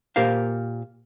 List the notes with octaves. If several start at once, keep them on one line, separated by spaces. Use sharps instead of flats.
A#2 G4 A#4 C5 F5